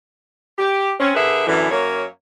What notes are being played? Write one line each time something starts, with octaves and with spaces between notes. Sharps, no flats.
G4
C4 C#4
D3 G#4 A#4 B4 E5
F#2 A2 D3 E3
F#2 A#3 C#5